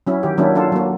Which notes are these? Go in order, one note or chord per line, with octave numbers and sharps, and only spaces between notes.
F#3 C#4 E4
D#3 G4
D#3 F#3 A#3 C#4 D4 E4
D4 F4 A4
F#3 A#3